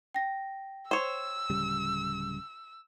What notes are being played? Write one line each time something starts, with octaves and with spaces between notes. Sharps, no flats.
G5 A#6
C5 C#5 E6
D1 C#3 G3